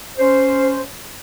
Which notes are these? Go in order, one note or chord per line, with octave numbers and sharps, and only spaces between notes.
C#4 C5